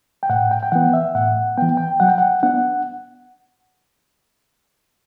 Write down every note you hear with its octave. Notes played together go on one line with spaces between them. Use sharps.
G5
A2 F#5
G5
G5
E3 B3 F#5
E5
A2 F#5
E3 B3 G5
G5
F#3 F#5
G5
F#5
B3 D4 F#5